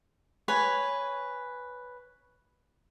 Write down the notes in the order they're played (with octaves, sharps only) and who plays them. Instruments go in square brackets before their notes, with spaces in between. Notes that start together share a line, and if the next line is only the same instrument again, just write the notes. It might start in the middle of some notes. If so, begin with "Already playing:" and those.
[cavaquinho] B4 C#5 G#5